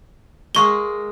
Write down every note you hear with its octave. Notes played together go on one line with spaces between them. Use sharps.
G#3 A#3 D#5 C#6 G7